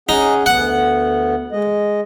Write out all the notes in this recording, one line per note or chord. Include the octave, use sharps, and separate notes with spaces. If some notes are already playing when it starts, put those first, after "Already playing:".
C#4 D#4 G#4 F#5
D2 B3 F#5
G#3 D#5